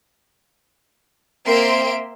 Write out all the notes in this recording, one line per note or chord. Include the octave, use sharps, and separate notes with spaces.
A#3 C4 A#4 E5 C6 D7